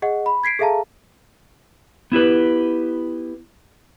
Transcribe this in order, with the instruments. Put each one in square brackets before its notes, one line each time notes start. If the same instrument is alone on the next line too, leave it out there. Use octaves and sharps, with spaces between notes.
[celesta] G#4 D#5 F#5
B5
G#6 B6 C7 D7
G#4 A4 E5 F5 A5 A#5
[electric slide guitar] B3 E4 G4 B4